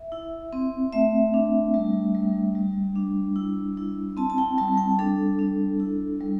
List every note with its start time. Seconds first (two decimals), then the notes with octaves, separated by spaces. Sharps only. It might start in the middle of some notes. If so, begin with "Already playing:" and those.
Already playing: E5
0.12 E4
0.53 C4
0.93 A3 E5
1.34 D4
1.74 G3
2.15 G3
2.55 G3
2.95 D4
3.36 E4
3.77 E4
4.17 C4 A5
4.30 A5
4.38 G5
4.58 G3 A5
4.78 G5
4.99 D4 A4
5.39 D4
5.80 E4
6.21 G3